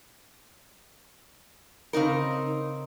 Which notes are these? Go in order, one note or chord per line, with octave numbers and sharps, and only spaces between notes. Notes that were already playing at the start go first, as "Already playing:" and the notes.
C#3 C4 D#4 A#4